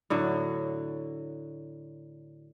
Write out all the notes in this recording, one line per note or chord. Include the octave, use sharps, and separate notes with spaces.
A2 D3 F#3